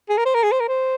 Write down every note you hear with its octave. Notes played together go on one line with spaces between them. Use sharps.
G#4
A#4
C5
A#4
G#4
C5
A#4
C5